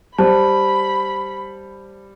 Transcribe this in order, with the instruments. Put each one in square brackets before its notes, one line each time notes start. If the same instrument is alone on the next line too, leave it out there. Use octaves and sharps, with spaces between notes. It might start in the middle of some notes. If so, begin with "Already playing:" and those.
[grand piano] G3 [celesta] C5 A5 [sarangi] B5